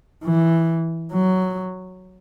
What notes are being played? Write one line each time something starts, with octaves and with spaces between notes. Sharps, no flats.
E3
F#3